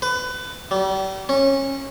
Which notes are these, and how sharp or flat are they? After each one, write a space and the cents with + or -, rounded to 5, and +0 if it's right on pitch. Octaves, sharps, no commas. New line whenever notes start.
B4 +25
G3 -35
C#4 -25